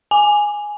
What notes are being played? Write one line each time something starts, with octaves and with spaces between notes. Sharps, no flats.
G#5